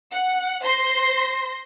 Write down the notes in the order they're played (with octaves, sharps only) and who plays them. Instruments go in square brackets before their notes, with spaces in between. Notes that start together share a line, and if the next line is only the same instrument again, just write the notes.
[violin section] F#5
C5 C6 A#6